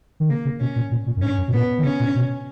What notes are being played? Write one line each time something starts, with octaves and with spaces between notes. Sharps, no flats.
D#3
C#3 A#3
C#3
B2 C#4
A#2
A#2
A#2
F#2
G#2 C#4
F#2
B2
A#2 B3
D#3
C#3 C#4
A#2
B2